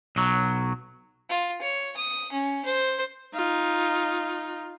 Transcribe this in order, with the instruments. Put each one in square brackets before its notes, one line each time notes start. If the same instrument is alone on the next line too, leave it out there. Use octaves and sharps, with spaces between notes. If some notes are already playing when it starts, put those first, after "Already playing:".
[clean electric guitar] B1 F#3
[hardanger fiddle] F4
C#5
D#6
C#4
C5
[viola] D#4 F4